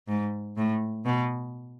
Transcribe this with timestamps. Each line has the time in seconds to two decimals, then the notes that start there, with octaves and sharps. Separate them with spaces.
0.08 G#2
0.57 A2
1.05 B2